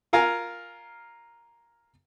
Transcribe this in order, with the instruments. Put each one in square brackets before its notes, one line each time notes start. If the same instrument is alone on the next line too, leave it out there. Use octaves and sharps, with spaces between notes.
[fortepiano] F4 A#4 F5 G#5 A#5